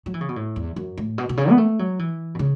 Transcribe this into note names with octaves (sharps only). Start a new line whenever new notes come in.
F#3
E3
C#3
B2
A2
E2
F#2
A2
B2
B2
C#3
B3
A3
F#3
E3
B2
C#3